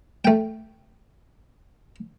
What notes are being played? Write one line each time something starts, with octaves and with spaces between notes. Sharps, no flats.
A3 G5